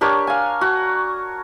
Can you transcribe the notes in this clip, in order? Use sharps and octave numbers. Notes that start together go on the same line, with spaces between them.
D4 G4 A#4 C#5
F5 G#5
F#4